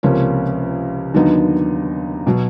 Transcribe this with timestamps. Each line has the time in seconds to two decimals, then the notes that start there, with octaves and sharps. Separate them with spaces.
0.03 C#2 C3 F3 A#3 C#4
1.14 D#2 D3 F#3 B3 D#4
2.27 B2 F#3